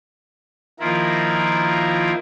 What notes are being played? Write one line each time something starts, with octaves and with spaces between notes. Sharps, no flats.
D#3 F3 A#3 E4 F4 A#4